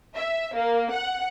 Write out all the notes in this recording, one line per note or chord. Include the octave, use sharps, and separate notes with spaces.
E5
A#3
F#5